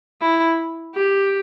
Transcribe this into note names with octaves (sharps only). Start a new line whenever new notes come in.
E4
G4